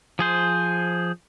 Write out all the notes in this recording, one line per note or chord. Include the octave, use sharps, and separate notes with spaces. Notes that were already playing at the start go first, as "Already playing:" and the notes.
F3 G#4 C5